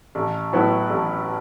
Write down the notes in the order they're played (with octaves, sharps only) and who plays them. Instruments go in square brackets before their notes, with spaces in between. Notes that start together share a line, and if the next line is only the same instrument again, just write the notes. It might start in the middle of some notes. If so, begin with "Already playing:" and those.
[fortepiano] A1
A2 F#3 B3 E4
A1